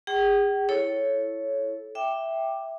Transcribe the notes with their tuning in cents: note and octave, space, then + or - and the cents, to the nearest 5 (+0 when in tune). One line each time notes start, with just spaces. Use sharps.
G#4 -35 G5 -40
E4 +0 A4 -10 C#5 +0
E5 +0 G5 +0 D6 +10